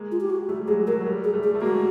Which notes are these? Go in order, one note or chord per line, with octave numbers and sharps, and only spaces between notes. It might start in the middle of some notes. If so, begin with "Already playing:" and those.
Already playing: G#3 A#3
F4
G4
F#4
G3 A3 G4
F#3 G#3 G#4
F#3 A#4
F#3
G3
G#4
G3 A3
G#4
A3
G#3 A#3 F#4